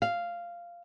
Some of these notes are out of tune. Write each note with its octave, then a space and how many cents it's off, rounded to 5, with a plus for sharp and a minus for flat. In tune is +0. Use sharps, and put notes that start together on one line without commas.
F5 -10